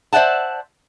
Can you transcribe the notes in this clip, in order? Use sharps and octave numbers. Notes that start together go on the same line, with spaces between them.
C5 D5 E5 F#5 A5